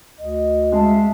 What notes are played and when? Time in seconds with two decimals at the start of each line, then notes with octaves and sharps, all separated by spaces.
0.19 D2 D#5
0.72 G#3 E5 F5 A5